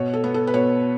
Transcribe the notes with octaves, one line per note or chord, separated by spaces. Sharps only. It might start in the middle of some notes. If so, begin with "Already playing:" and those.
Already playing: B2 C#5
A4
B3
A4
B4
B2 C#5